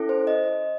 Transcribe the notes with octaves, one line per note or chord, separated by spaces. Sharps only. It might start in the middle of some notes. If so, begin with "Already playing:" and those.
Already playing: C#4 E4 A4
C5
D#5